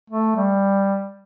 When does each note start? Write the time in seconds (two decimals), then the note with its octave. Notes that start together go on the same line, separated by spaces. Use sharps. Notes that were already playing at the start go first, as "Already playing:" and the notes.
0.10 A3
0.36 G3